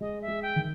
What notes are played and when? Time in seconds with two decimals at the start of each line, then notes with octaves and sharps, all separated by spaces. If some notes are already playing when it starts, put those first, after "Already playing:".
0.01 G#3 D#5
0.22 E5
0.28 G#3
0.43 G5
0.56 D#3